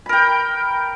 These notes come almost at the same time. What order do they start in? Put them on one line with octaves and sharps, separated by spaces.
B5 A#4 G5